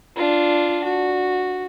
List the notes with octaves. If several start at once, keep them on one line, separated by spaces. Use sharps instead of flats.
D4 F4
F#4